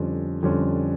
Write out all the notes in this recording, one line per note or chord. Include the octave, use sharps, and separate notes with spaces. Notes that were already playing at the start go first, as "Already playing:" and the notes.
Already playing: F2 D3 G3 C#4
F2 D3 G3 C#4